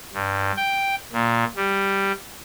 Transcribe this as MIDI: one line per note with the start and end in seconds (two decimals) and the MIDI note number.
0.14 0.52 43
0.57 0.95 79
1.13 1.44 46
1.56 2.12 55